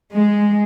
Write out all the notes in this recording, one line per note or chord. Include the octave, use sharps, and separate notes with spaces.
G#3